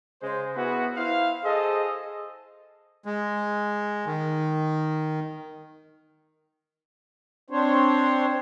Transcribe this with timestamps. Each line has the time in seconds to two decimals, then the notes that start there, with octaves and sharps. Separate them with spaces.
0.21 C#3 G#3 C5
0.55 B3 E4 F#4 G#4 B4
0.96 E4 C5 F5
1.44 G#4 A4 C5 D#5
3.05 G#3
4.06 D#3
7.50 C4 D4 C5 C#5